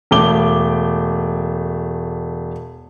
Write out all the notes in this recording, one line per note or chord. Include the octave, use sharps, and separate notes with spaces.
E1 A3 D6 G7